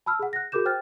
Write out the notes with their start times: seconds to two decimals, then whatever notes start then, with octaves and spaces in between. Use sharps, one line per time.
0.06 A5 B5 E6 F6
0.19 G#4 F#5
0.33 F#6 A#6
0.52 F#4 G#4 A#4 D6 G6 E7
0.65 C5 G5 F6 F#6 A6